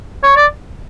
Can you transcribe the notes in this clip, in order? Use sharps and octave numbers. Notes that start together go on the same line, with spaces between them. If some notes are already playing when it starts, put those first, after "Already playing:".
C#5
D5